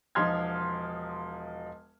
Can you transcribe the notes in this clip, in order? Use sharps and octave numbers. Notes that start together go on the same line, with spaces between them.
E1 F3 D#4 C6 F6 G#6